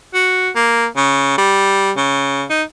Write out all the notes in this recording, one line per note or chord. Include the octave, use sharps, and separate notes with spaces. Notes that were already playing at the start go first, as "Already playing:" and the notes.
F#4
A#3
C#3
G3
C#3
D#4